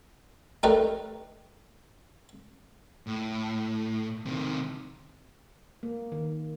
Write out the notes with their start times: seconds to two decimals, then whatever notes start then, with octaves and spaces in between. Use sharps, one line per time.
0.63 A3 D#4 G4 A#4 B4 D5
3.07 A2
4.26 C3 D#3
5.83 A#3
6.12 D#3